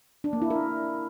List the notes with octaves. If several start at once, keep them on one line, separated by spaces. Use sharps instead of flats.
D4
A#3
E4
A#4